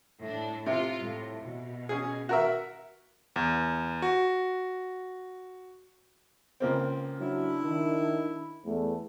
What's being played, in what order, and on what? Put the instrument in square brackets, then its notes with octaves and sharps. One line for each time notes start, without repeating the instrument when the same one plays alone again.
[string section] A2 D4
[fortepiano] C3 [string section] F4
[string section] A2
B2
[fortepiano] C#4 G#4
F#4 A#4 E5
[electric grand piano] E2
F#4
[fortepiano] C#2 A#3 C4
[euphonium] F#3 [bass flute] D4 [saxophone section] E4
[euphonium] D#3
[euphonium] E2 [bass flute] A3